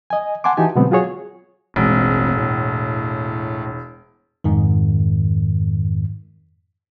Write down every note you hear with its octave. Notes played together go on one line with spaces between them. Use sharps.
D#5 G#5
F#5 G#5 A5 C6 D6
E3 D#4 F#4 G4 G#5 A5
B2 D3 F#3 G#3 B3 C4
F#3 F4 F#4 G#4 C#5
E1 A1 G#3 C4
A2
F2 G#2 D#3